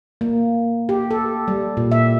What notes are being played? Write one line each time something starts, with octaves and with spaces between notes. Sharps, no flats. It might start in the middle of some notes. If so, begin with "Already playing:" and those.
A#3
G4
A4
G3
A#2
E5